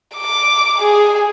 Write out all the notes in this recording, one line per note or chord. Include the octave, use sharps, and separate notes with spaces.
D6
G#4